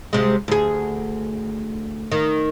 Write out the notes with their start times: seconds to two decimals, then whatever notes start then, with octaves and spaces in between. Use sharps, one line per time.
0.13 C3 G#3
0.48 D2 G#4
2.12 D#3